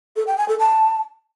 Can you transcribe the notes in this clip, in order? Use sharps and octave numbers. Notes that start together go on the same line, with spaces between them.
A4
G5
G#5
A4
A5